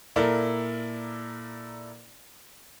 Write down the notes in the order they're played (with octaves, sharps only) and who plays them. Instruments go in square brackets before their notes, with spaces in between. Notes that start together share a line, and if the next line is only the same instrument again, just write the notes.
[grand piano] A#2 E4 A4 A#4 D5